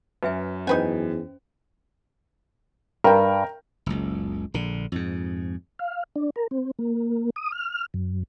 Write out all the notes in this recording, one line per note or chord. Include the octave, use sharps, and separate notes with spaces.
F#2 B4 E5 G#5
E2 C#4 D#4 B4 C5 G5 G#5
G2 A#4 G5
F#1 C#2
A#1 D3
F2 G#2
F5
D4
A#4
C4
A#3
D#6
F6
F#2